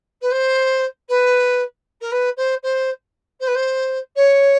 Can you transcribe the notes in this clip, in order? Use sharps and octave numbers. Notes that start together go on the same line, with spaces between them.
B4
C5
B4
A#4
B4
C5
C5
C5
B4
C5
C#5